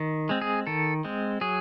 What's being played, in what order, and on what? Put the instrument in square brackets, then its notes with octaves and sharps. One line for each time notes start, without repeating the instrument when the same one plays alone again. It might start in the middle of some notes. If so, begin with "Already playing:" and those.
Already playing: [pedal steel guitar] D#3
G#3 C4
G#4
D#3 A4
G#3 C4
F#3 G#4